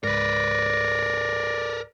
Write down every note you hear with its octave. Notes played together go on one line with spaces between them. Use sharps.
C#2 G#2 A#4 B4 D5 A#6